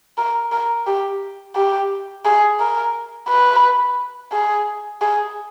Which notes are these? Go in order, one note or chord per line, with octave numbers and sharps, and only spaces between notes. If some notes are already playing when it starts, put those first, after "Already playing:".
A#4
A#4
G4
G4
G#4
A#4
B4
G#4
G#4